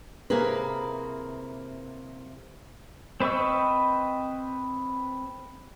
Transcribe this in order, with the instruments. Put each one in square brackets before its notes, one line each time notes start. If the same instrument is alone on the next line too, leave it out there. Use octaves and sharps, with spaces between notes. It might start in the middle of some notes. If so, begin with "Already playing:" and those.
[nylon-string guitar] C3 A#3 E4 G#4 A#4 B4
[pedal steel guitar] C4 B4 D#5 C#6 E6